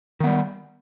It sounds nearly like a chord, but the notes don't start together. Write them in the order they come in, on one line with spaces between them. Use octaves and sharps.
D#3 B3 G3